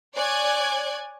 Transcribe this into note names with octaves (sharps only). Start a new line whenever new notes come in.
C#5 D5 G#5 F#6 G#6